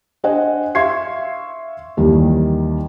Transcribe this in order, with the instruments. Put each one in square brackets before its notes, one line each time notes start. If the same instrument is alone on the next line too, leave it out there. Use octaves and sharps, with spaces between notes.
[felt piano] D4 C5 D#5 F#5 G#5
E5 F5 C6 C#6 G#6 C7
D#2 D#3 E3 G3